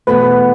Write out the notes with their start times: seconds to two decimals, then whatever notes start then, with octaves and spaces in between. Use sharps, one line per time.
0.07 E2 B2 A3 B4